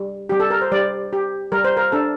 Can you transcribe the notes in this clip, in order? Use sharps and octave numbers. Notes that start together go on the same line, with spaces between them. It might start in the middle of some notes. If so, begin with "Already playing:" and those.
Already playing: G3
G3 G4
A4
A#4
C5
G3 D5
G4
G3 A#4
C5
A#4
D4 A4